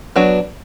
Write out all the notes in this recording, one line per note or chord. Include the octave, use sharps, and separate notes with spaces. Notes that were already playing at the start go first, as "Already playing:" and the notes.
F#3 B3 D4